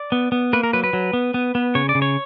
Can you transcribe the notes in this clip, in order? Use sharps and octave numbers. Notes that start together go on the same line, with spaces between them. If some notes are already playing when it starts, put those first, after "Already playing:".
Already playing: D5
B3
B3
A#3 B4
A#4
F#3 B4
B4
F#3
B3
B3
B3
C#3 C#5
D5
C#3
C#5